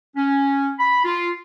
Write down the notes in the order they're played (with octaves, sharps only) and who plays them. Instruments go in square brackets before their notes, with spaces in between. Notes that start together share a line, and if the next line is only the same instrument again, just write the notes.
[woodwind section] C#4
B5
F4